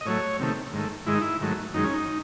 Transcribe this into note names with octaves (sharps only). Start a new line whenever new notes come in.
D#5
A2 F#3 A3 C#5
C3 D#3 A3
G#2 D#3 A3
G#2 D#3 G#3 E4
D#4
E4
G#2 D#3 F#3 A3
F#2 D#3 G#3 D#4
C#4
D#4